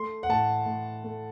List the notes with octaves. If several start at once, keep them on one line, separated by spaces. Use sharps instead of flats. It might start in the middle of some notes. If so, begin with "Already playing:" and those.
Already playing: A3 C6
F#5
A2 A5
A2
A3